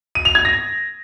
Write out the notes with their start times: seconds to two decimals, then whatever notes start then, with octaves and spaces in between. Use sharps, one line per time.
0.15 D#7
0.25 F7
0.35 G#6
0.45 A#6